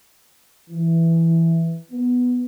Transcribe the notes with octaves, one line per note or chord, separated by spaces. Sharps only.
E3
B3